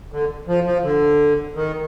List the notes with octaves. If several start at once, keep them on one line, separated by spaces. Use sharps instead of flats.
D3
F3
F3
D3
D#3